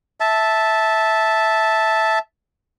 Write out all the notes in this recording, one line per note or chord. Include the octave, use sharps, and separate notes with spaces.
E5 A5